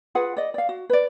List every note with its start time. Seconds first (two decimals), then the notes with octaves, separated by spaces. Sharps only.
0.15 F4 G#4 B4 F#5
0.37 D5 D#5
0.54 D5 F5
0.69 F#4
0.90 B4 D5